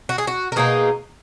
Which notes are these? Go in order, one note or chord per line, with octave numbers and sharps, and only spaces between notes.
F#4
G#4
F#4
A#4
B2 A#3 D#4 G#4